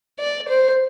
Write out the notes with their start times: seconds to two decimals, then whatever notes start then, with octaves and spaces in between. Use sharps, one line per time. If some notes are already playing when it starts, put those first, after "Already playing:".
0.20 D5
0.49 C5